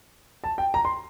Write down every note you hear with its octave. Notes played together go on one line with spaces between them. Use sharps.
A5
G5
A#5
C6